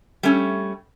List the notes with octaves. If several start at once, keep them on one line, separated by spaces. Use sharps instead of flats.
G3 A3 C#4